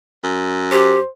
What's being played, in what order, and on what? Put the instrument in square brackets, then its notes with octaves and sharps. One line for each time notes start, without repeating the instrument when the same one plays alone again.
[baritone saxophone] F#2
[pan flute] G4 [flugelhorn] C5